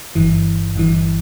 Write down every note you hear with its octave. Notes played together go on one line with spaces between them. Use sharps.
G1 G2 E3
G1 G2 E3